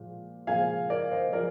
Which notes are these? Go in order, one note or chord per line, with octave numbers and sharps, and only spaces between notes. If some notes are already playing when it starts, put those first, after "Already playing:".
Already playing: A#2 F3 G#3
A#2 F3 G#3 F5 G#5
A#4 D5
C5 D#5
F3 G#3 A#4 D5